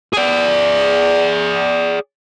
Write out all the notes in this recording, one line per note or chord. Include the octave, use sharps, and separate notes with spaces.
G#4 D5